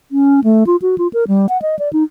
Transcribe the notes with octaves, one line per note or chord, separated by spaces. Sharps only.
C#4
A3
F4
F#4
F4
A#4
G3
F#5
D#5
D5
D#4